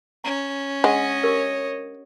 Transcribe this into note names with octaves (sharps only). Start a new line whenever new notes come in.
C#4 A#5
G#3 D4 C#5 D#5 F#5 G#5
G4 A#4